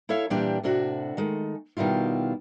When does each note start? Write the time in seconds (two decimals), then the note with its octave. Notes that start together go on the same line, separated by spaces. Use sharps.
0.09 E4 A4 C#5 E5 F5
0.30 A#2 E3 G3 D4 G4 D5
0.63 A2 C3 D4 F#4
1.17 D#3 G#3 A3
1.77 B2 D#3 G3 E4 F4